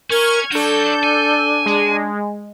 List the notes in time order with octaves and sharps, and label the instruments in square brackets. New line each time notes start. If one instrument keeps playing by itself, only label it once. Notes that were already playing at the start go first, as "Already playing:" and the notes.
[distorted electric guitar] C#4 [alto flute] A#4 [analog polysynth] C#6 F6 G#6
[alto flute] D4 [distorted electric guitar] F#4 C#5 [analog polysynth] A4 G6
[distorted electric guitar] G#5
[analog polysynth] G#3